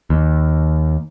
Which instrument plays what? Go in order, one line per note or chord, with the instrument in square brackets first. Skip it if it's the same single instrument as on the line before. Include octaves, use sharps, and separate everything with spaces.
[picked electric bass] D#2